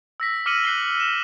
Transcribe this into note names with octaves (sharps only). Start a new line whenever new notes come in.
E6 A#6 B6
D6 F6 C#7 D#7 F#7
F#6 C7 D#7 G7
E7